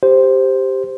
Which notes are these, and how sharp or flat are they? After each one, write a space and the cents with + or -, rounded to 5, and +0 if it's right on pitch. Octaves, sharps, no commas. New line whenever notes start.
G4 +0 C5 +0